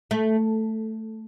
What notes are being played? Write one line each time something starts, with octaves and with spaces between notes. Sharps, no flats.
A3